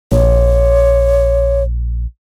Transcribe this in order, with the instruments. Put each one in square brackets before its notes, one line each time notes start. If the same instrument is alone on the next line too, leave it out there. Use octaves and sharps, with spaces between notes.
[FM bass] A#1 [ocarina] C#5